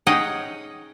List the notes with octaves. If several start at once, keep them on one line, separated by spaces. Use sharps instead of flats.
C#4 D#4 G#4 D#5 F#5 G5